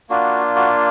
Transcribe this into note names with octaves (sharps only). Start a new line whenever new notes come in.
A#3 D4 F4 F#4
F#4